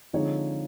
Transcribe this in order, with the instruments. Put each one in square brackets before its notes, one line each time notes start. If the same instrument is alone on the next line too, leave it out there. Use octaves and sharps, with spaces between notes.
[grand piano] D3 F3 G#3 C4 D#4 C#5